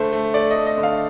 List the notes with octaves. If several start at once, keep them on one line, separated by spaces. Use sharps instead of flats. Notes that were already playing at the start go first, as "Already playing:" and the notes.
Already playing: D3 A3 C5
A3
A3 D5
D#5
A3
D#5
D3
F5